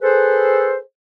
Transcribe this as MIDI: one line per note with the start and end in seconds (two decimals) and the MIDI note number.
0.02 0.79 68
0.02 0.79 69
0.02 0.79 71
0.02 0.79 72